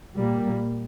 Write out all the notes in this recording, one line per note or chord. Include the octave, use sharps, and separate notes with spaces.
A#2 G3 A#3